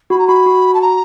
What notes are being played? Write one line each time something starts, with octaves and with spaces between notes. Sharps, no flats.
F#4 B5
A#5
F#4 B5
F#4
A5
A#5